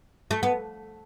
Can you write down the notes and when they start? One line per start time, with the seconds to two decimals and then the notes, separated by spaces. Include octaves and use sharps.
0.31 A3
0.43 B3